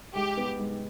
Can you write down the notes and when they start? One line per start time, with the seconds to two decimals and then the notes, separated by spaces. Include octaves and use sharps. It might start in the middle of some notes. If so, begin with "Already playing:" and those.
0.15 G#3 G4
0.37 B3
0.59 G#3